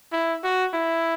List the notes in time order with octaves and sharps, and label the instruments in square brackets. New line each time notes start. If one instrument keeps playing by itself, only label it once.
[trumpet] E4
F#4
E4